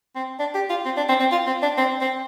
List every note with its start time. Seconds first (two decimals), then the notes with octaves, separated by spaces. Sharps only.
0.15 C4
0.39 D4
0.55 G4
0.69 F4
0.85 C4
0.97 D4
1.08 C4
1.20 C4
1.32 F4
1.46 C4
1.63 D4
1.78 C4
2.01 C4